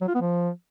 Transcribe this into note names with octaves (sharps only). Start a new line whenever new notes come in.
F#3
F4
B3
F3